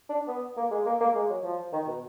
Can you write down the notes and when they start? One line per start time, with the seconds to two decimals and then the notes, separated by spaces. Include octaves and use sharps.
0.09 D4
0.28 B3
0.57 A#3
0.71 G#3
0.86 A#3
1.01 A#3
1.15 G#3
1.30 F#3
1.44 F3
1.73 D#3
1.87 B2